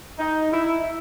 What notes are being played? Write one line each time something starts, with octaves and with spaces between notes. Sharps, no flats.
D#4
E4